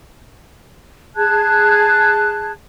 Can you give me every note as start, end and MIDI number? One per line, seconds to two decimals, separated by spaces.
1.16 2.51 68
1.16 2.51 81
1.16 2.51 90
1.16 2.51 92